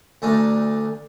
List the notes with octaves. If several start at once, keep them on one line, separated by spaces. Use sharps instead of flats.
D2 A3 D4 G#5 A#5